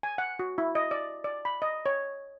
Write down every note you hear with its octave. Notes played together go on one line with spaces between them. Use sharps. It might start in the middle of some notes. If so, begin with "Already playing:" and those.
G#5
F#5
F#4
E4
D#5
D5
D5
B5
D#5
C#5